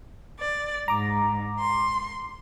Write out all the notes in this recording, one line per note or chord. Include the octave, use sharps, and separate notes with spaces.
D5
G#2 A#5 D6
C6